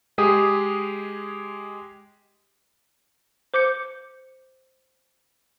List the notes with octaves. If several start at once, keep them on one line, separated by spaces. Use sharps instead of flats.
G#3 G4 G#4 D#6
C5 D6 G6 C#7